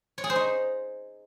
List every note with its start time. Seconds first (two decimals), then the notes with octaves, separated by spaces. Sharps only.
0.18 C#5
0.24 G#4
0.30 C5
0.36 D#4